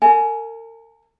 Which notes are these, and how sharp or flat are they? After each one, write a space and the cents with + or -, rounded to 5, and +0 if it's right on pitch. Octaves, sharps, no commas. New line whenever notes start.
A#4 -40 G#5 +20